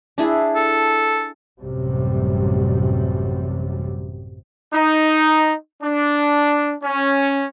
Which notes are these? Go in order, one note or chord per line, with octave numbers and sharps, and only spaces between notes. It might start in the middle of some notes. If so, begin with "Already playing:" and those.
D4 E4 G#4
A4
A1 F#2 C3 G3
D#4
D4
C#4